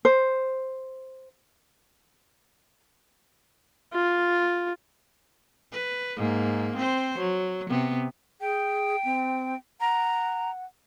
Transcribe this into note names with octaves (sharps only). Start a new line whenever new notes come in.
C5
F4
B4
G#2 A#3
C4 C5
F#3
C3 B3
G#4 G5
C4
F#5 A#5